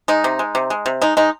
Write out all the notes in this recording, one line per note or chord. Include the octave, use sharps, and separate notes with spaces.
G#3 D#4
C3
G#3
C3
G#3
C3
G#3 D#4
G#3 D#4